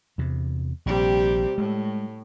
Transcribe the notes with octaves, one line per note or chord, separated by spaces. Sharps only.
E2 C3
A#1 C3 G3 G4
A2 G#3